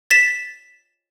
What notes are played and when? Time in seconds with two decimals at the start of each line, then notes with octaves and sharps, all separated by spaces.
0.11 A6 B6 E7